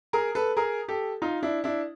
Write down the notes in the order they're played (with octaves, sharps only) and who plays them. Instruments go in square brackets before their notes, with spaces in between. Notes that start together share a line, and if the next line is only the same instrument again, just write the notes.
[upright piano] G#4 A#4
A4 B4
G#4 A#4
G4 A4
D#4 F4
D4 E4
D4 E4